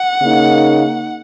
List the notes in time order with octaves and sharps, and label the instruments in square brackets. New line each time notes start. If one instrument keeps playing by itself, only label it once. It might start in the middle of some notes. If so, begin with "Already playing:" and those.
Already playing: [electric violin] F#5
[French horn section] C#3 A#3 D#4